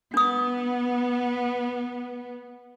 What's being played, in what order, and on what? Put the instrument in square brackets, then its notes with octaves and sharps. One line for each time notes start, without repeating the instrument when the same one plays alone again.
[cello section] B3 [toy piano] D4 D#6